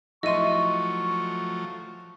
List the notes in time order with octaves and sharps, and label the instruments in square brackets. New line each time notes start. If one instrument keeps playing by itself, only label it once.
[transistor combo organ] F3 F#3 A3 [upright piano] E4 C6 [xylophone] D#5 D#7 [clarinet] C#6